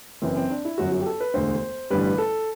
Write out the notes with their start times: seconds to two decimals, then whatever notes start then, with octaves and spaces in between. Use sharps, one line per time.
0.22 F#1 F#2 E3 C4
0.37 C4
0.50 D4
0.65 E4
0.78 G1 F#2 F#3 F#4
0.92 F#4
1.01 G4
1.06 A4
1.20 B4
1.34 E1 D2 D3 C5
1.90 A1 G2 D3 G3 B4
2.18 A4